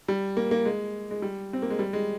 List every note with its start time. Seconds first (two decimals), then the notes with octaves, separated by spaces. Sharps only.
0.08 G3
0.37 A#3
0.51 A#3
0.65 G#3
1.11 G#3
1.22 G3
1.53 C4
1.62 A#3
1.70 G#3
1.79 G3
1.93 G#3